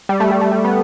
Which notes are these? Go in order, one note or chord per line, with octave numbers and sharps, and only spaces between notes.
G3
A3
G3
A3
G3
B3